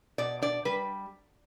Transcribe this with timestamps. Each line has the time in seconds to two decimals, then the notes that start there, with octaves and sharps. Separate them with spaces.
0.18 B2 D5
0.42 D4 D5
0.65 G3 B4